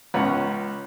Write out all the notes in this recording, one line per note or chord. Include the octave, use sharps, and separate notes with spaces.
C#2 C#4 F#5 A#5 B5